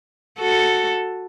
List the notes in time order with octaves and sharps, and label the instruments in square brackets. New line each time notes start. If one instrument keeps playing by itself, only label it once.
[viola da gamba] F#4 A4